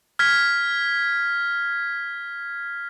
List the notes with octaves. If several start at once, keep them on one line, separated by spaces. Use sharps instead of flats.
F6 G#6 B6